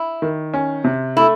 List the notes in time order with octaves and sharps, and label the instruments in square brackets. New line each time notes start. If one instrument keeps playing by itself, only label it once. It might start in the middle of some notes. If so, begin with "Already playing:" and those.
Already playing: [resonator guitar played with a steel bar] E4
[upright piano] D#3
C#4
C3
[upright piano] A3 [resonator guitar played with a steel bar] E4